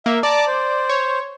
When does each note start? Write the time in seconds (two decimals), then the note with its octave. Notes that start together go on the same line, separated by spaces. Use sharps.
0.06 A#3 E5
0.23 D5 A5 A#5 D6
0.47 C5
0.89 C#5